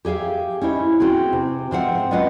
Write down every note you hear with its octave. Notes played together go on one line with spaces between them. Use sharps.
G4 G#4 E5 F5
C#4 D#4 E4 C5
C4 F#4 G#4
C3
G#2 F3 C4 F4 E5 F#5
G#3 C#4 F4 B4 D#5 F#5